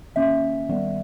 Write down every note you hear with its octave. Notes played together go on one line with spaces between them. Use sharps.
D#3 A#3 C#4 E5
D#3 G3 B3